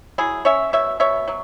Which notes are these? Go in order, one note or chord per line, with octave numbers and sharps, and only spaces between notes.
F#3 E4 G#4
C#4 C#5 E5
B2 C#5 E5
B2 C#5 E5
F#3